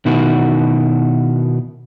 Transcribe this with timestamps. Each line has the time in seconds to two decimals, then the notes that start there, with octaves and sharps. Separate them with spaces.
0.06 B2 D#3 E4 F#4